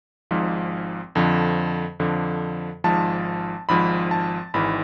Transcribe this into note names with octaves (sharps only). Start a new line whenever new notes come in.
G#1 G#2 F3
F2 D3 F3
F2 D3 F3
G#1 G#2 F3 A5
G#1 G#2 F3 B5
A5
G#1 G#2 E3 B5